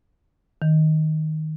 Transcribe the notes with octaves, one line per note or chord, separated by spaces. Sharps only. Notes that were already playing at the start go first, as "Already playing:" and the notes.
D#3